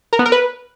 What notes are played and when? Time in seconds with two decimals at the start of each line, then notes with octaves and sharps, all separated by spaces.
0.13 A#4
0.19 B3
0.26 A#4
0.32 B4